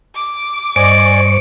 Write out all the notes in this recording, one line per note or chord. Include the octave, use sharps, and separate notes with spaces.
D6
G2 C5 D5 D#5 G#5 C#6 D7